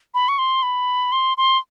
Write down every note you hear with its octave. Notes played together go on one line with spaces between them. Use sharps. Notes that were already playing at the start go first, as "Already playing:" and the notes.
B5
C#6
C6
B5
C6
C6